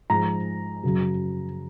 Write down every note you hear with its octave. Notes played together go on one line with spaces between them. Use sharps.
G#2 F3 A#5
F#2 C#3 F#3